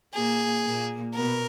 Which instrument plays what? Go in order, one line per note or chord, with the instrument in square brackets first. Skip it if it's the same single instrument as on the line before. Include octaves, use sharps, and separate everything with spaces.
[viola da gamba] A#2 A#3 [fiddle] G#4
[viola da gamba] A#2 A#3
[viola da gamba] B2 B3 [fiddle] A#4